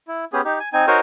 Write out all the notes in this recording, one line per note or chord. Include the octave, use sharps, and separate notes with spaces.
E4
B3 C#4 G4 G#4
D#4 G4
G#5
C4 D#4 G#5
D#4 F#4 A#4 C5 C#5 G#5